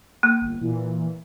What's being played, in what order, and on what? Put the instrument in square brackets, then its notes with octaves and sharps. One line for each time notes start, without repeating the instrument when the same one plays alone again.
[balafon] A#3
[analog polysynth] G1
A#2 E3